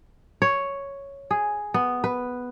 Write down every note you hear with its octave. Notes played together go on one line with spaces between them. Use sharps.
C#5
G#4
B3
B4